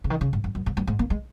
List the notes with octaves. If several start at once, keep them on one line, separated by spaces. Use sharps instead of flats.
C#3
D#3
C#3
G#2
F#2
F#2
G#2
F#2
G#2
A#3
G#3